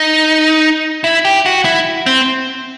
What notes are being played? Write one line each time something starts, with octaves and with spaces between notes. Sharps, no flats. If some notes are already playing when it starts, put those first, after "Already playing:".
Already playing: D#4
E4
G4
F#4
E4
C4